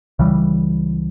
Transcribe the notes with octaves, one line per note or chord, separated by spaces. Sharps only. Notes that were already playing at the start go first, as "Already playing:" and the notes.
C#2 C#3 E3 G3